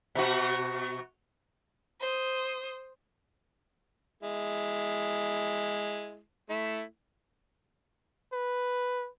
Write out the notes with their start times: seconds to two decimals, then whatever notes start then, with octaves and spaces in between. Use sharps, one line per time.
0.15 B2 F#4
2.01 C5 D#6
4.23 G#3 E4
6.50 A3 E4
8.33 B4